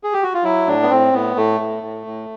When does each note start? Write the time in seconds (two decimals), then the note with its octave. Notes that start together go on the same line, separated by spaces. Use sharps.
0.04 G#4
0.13 G4
0.23 F#4
0.34 F4
0.44 F#3 E4
0.67 A2 D4
0.83 B3
0.90 A2 C4
1.14 A2 B3
1.36 A2 A3
1.60 A2
1.83 A2
2.07 A2